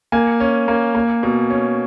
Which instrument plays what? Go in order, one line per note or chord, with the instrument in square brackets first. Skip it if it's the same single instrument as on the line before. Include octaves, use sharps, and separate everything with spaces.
[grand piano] A#3 G#5
C#4
A#3
A#3
B2
C#4